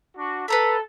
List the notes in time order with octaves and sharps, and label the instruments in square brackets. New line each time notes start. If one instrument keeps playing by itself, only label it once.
[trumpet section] D4 F#4
[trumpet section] A4 [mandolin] B4 A#5 B5